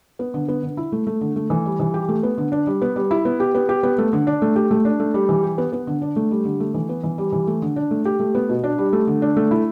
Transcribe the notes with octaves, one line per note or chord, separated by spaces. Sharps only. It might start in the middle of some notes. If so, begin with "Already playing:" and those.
B3
D3
B3
D3
E4
A3
A3
D3
A3
E3
G3
E3
G4
A3
B3
D3
D4
G3
B3
G3
E4
B3
G4
B3
G4
B3
A3
D3
D4
A3
G4
A3
D4
A3
G3
E3
G4
B3
B3
D3
D4
A3
G3
D3
A3
E3
B3
E3
G3
E3
A3
D3
D4
A3
G4
A3
B3
B2
D4
G3
A3
D3
D4
A3
E4